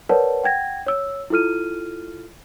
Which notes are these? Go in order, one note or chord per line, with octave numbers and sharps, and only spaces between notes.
A#4 B4 C#5 D5 F#5 A5
F#5 G5 G#6 A#6
C#5 E6
E4 F4 A4 F6 D#7